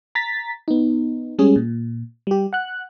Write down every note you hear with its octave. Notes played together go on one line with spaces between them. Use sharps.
A#5 A6 B6
B3 D#4
G3 G#3 C#4 G#4
A#2
G3 G4
F#5 F#6